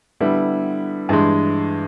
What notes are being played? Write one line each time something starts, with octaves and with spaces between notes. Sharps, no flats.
D3 G3 B3 E4
G2 E3 G#3